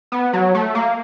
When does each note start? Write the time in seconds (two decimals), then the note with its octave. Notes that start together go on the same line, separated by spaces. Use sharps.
0.12 B3
0.33 F#3
0.55 A3
0.75 A#3